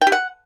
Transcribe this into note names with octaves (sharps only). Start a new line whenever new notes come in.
G5
G4
F#5